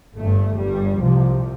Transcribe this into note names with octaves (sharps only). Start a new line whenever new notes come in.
G1 G2 A3
G1 G2 G3
C2 C3 F3